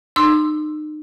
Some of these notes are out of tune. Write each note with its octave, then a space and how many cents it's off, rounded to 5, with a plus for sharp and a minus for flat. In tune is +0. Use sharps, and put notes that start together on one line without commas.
D#4 -35 C6 +0 E6 +0